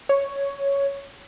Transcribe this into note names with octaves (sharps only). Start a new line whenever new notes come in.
C#5